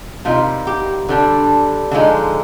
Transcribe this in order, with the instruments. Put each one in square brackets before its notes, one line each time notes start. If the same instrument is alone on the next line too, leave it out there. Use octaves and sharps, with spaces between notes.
[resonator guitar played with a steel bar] C3 G3 A#3 D#4 F4
G4
D3 G3 D4
D3 F3 G#3 D#4